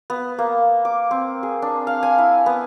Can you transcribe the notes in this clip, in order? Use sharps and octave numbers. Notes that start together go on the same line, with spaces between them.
B3
A#3
D6
C4
G#4
D4
F5
G#5
E4
B3